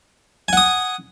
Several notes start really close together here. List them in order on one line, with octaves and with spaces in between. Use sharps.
G#5 F#5 D#6